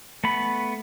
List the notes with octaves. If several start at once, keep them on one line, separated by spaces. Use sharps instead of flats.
A3 B3 B5